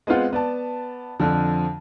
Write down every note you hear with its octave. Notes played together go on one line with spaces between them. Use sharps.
G#3 B3 C4 F4 F#5
B3 D5 A5
F2 D3 F3